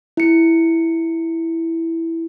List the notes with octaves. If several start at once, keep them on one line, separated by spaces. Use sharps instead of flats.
E4 C#7